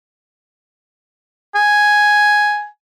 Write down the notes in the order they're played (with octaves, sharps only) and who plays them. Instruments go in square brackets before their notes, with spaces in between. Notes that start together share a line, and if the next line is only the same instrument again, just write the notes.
[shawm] G#5